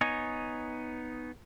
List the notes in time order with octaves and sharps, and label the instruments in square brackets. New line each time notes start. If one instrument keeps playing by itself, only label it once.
[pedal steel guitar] B3 D#4 C#5 D#5 G#5